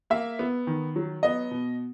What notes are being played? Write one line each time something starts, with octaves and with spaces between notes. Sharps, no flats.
A#3 E5
B3
D#3
F#3
B3 D#5
B2